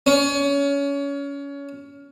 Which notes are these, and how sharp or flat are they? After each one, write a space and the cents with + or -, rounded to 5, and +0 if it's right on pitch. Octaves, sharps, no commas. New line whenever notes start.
C#4 +25